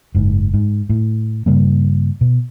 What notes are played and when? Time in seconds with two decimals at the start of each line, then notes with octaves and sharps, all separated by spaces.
0.14 F#1 G#2
0.54 G#2
0.90 A2
1.46 G2 C#3 G3 A#3
2.21 B2